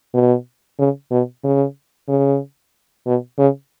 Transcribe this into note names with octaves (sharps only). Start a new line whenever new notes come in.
B2
C#3
B2
C#3
C#3
B2
C#3